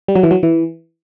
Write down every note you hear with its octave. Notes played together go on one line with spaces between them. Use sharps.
G3
F#3
E3
F#3
E3